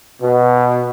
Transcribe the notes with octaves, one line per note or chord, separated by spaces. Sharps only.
B2